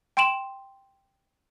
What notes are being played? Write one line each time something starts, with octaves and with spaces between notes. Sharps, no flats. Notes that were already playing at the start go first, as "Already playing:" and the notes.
G5 C6 D7 E7 F#7